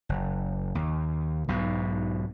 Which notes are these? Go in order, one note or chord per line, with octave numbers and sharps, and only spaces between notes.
F#1
D#2
B1 G#2 B2